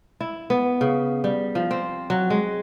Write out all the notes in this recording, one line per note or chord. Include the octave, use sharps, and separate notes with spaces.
E4
B3
C#3
G3
F3
C4
F#3
G#3